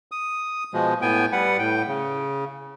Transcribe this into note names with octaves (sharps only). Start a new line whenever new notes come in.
D#6
B2 F3 G#3
A2 B3 G5 G#5
G3 B4 F#5
A2 G5
C#3